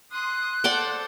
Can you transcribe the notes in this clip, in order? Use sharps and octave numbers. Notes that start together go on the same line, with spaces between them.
C6 D#6 F#6
A4 C5 D5 F#5 G5